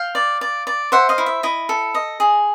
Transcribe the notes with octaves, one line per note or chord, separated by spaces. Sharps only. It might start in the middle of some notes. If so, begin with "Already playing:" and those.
Already playing: F5 G5
D5
D5
D5
C5 E5 F#5
D#5 F5
E4
E5
E4 D#5
A4
D#5
G#4